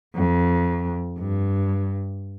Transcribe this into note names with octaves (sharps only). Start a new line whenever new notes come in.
F2
G2